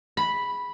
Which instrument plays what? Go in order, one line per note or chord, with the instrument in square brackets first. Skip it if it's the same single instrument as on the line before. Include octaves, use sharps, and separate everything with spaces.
[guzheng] B5